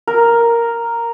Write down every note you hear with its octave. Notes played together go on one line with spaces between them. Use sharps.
A#4